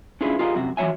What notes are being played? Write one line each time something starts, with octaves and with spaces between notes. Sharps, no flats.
C#4 D4 E4 F4 G#4 B4
F4 G4 G#4 A#4 D#5 F5
F#2 C3 F#4
E3 F#3 F#4 C#5 E5 G#5